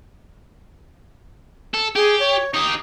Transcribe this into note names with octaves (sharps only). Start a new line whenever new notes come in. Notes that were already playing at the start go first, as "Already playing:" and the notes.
A4
G4 G#4
C#5
D#4 G4 D#6